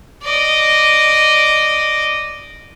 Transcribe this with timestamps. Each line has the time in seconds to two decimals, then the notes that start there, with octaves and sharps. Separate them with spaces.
0.22 D5 D#5